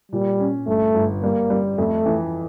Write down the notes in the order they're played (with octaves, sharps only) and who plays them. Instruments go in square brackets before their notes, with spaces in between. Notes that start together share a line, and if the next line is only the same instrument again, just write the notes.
[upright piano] A#2 [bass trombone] G3
[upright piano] C#4
[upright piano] G1 [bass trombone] A3
[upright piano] G1
[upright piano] G3 [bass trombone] A#3
[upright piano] G3
[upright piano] F2 [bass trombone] A3
[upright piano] E3